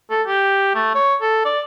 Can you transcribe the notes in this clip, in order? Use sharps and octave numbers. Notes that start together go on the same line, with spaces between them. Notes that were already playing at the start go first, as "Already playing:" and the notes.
A4
G4
A3
C#5
A4
D5